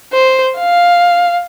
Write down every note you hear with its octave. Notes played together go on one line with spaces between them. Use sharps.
C5
F5